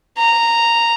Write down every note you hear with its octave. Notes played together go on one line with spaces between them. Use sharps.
A#5